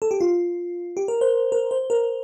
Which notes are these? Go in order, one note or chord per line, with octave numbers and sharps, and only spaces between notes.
A4
G4
F4
G4
A#4
C5
A#4
C5
A#4